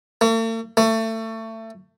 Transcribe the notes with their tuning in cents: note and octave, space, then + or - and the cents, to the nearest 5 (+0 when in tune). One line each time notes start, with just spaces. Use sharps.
A3 +45
A3 +25